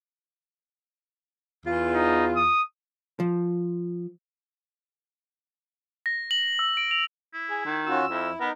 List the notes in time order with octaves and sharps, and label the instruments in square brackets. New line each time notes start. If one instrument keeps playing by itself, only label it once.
[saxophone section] E2 F4
[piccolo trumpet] D#4
D#6
[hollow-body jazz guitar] F3
[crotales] A#6
F#7
E6
D7
F7
[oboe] E4
[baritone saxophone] G#4
D#3
[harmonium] C#4 F4 F#4 [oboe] E6
[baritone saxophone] F2 [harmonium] E4
[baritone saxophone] B3 [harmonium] D#4 [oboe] A#4